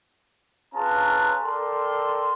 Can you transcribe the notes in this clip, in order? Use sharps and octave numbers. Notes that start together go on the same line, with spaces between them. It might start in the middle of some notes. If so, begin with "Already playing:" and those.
C#4 F4 G#4 B4 A5 A#5
A4 A#4 D5 G5 C6